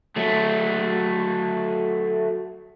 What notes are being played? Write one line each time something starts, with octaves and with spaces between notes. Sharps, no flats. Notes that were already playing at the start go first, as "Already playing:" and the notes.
F#3 A3